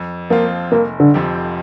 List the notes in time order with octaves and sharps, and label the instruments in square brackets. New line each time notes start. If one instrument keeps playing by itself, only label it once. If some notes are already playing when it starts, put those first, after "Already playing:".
Already playing: [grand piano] F2
[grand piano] F3 C4 F4 [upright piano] A#3
[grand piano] F1 [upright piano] A#3
[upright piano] D3
[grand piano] F2 F3 C4 G4